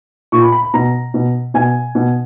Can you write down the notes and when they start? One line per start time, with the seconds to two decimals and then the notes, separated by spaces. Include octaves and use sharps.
0.32 A#2 C#6
0.42 B5
0.52 B5
0.63 B5
0.74 B2 A#5
1.14 B2
1.54 B2 G#5
1.95 B2